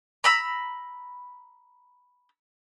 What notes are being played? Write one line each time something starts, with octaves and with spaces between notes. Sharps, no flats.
A#5 B5 E6